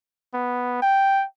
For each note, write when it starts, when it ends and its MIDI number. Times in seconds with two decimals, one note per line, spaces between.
0.34 0.79 59
0.82 1.25 79